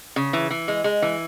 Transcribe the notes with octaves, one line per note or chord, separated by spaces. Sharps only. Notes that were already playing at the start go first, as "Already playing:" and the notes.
C#3
E3
E3
G#3
G#3
E3